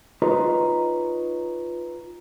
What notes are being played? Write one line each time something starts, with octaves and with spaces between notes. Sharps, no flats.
D#4 F4 B4 C#5 D#5 A#5